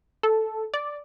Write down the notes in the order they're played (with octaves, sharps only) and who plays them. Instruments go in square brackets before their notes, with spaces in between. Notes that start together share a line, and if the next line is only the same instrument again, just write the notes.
[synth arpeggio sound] A4
D5